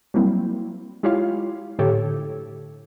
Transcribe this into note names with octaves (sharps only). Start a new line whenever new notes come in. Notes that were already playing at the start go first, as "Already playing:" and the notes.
F#3 G3 A#3 C4 E4
G#3 E4 F4 G4 C#5 F5
A2 D3 G4 A4 C#5